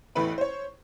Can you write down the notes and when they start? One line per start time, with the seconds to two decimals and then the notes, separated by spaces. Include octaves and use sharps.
0.15 A1 E2 A3 B4 B5
0.38 C5 C#5